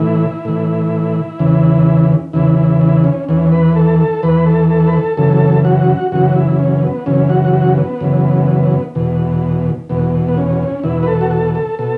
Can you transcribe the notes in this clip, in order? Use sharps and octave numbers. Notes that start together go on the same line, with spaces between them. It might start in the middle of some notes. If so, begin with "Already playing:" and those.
Already playing: A2 E3 E4
A2 E3
E2 C#3 E3
E2 C#3 E3 E4
E4
E4
C#4
E2 E3 C#4
B4
A4
A4
E2 E3 B4
A4
A4
B4
A4
F#2 C#3 E3 A4
F#4
F#2 C#3 E3 F#4
E4
C#4
B3
F#2 C#3 E3 C#4
F#4
F#4
B3
F#2 C#3 E3
E2 B2
E2 B2
B3
C#4
E2 B2 E4
B4
A4
F#4
A4
A4
B2 A4